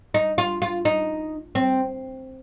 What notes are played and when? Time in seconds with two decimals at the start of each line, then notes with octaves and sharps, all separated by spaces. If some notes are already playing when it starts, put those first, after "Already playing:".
0.14 D#4
0.38 F4
0.62 F4
0.85 D#4
1.55 C4